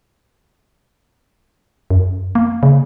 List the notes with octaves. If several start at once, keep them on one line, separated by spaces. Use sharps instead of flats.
F#2
A#3
C#3